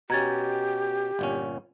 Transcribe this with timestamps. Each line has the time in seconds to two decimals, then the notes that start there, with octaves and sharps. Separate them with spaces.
0.10 B2 C#4 G4 A#5 G#6 A6
1.19 G1 A#2 C#4